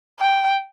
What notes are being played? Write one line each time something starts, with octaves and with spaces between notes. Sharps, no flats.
G5